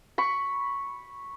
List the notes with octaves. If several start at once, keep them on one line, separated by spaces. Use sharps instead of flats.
B5 C#6